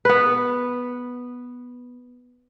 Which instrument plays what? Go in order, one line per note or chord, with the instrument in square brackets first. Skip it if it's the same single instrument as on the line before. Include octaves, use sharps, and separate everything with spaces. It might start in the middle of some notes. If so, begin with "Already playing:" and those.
[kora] B3 B4